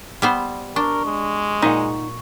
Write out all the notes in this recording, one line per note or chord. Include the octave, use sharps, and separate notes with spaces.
G3 B3 C5
D4 A#4 C#6
G#3
A#2 D#4 F#5